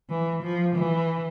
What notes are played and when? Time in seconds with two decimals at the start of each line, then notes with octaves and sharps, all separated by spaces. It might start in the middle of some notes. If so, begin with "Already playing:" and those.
0.09 E3
0.43 F3
0.76 E3